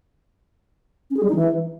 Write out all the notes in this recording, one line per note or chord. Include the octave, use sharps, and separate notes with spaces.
C#4
G#4
G3
D#4
E3